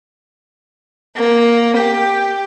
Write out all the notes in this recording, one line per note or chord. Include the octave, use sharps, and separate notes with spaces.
A#3
G4